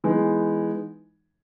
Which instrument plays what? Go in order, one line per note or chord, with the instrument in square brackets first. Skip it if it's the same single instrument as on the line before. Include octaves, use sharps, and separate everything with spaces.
[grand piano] E3 G#3 B3 D#4